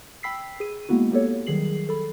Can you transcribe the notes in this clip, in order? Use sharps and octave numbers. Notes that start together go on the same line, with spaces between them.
G5 B5 E6 B6 C7
G#4 D#7
G#3 A#3 B3 E4 F#4
A#3 B3 G4 A4 C#5
D#3 F#3 G3 G#4 C7 F#7
A4 B5